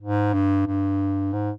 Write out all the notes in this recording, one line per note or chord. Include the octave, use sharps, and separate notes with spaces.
G#2
G2
G2
G#2